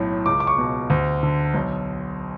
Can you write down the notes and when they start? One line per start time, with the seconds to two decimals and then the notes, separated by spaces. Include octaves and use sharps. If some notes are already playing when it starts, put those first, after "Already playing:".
Already playing: B1 A2
0.26 C#2 D6
0.40 D6
0.47 C#6
0.58 B2
0.90 D2
1.23 D3
1.54 B1